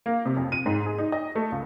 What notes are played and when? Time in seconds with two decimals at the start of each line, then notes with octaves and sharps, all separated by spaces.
0.06 A#3
0.26 C3
0.37 F2
0.52 D#7
0.66 G#2
0.86 G#4
0.98 D#4
1.12 D#5
1.35 A3
1.52 C#2